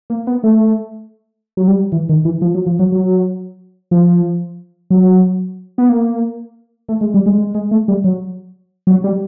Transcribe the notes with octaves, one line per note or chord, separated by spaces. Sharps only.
A#3
B3
A3
F#3
G3
E3
D#3
E3
F3
F#3
F3
F#3
F#3
F3
F#3
B3
A#3
A3
G#3
G3
G#3
G#3
G#3
A3
G3
F#3
F#3
G3